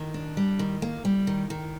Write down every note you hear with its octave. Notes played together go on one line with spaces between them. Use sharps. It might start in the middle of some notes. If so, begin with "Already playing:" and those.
Already playing: D#3
D4
G3
D#3
A#3
G3
D#3
D#3